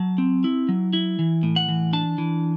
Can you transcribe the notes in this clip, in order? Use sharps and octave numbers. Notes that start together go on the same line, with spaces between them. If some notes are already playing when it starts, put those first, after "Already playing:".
Already playing: F#3 A5
C4
E4
F#3
E4
E3
A2
F#5
E3
D4 A5
E3